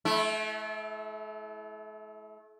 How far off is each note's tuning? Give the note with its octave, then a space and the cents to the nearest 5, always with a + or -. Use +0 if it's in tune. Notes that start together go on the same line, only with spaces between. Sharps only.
A3 -40 E4 +0